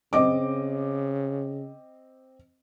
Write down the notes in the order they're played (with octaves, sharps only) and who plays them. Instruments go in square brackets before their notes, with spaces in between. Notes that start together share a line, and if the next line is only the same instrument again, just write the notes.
[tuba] C#3 [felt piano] C4 D#5 D6